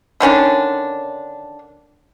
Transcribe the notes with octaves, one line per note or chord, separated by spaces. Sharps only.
D3 D#3 C#4 D4